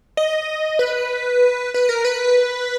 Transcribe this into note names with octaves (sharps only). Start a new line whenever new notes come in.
D#5
B4
B4
A#4
B4